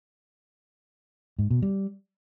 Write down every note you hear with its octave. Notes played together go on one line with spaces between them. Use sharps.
G#2
B2
G3